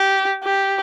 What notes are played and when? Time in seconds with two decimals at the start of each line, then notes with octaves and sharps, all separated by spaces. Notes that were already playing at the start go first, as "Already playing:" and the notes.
Already playing: G4
0.44 G4